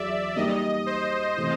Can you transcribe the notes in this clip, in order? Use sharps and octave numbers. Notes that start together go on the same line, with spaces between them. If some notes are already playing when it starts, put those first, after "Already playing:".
Already playing: E2 F#3 D5 E5
G3 A#3 D#4 G4 A#4 D#5
C5
C3 E3 A3